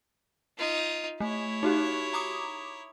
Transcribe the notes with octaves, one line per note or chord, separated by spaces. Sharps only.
D#4 F4
A3 E4 C#5
D#4 F#4 G4
A#5 D6 D#6